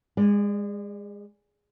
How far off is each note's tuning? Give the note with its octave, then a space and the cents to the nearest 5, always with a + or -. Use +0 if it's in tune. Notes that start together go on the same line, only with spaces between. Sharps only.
G#3 -25 D5 +20